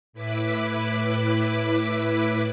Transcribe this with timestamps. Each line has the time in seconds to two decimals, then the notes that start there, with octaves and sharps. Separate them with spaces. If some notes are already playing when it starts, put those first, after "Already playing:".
0.13 A2 E4 B4 B5 D6